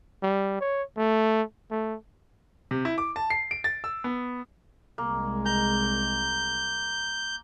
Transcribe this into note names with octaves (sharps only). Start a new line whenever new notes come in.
G3
C#5
A3
A3
C3
E4
D6
A5
C7
D7
A6
E6
B3
C2 G#3 A#3
A#5 G6